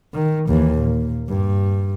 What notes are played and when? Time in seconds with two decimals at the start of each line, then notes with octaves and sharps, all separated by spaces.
0.14 D#3
0.48 D#2 E3
0.78 A#2
1.28 G2